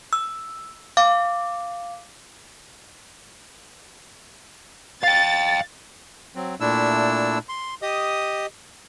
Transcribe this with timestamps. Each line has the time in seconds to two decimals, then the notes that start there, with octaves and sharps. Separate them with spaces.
0.13 E6
0.97 F5 D6
5.03 F5 G5 A6
6.36 F#3 C4
6.60 A#2 A3 D4 E4 E6
7.49 C6
7.82 G4 D#5 D#6